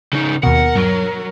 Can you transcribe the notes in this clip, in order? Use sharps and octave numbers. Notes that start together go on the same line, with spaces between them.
C#3 D#4
D#2 B2 A#4 F#5
G2 F#3